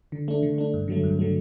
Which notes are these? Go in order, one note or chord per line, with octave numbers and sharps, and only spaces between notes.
D3
A3 D4
D3
A3 D4
G2
D3 F#3 A3
G2
D3 F#3 A3